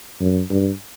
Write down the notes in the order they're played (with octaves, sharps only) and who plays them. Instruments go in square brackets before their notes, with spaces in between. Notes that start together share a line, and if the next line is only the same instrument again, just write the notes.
[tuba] F#2
G2